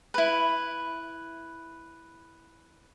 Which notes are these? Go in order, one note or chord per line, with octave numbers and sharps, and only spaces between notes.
E4 B4